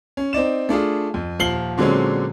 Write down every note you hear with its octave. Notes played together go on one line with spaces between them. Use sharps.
C#4
C4 D#4 D5 E7
A3 D4 F4 G#4
F2
D#1 F3 C7 F#7 G7
A#2 D3 F#3 G#3 C4 C#4